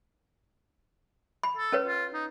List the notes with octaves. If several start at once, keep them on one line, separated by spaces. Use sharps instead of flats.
B5
A4
C#4 B4 C#5
F4
D#4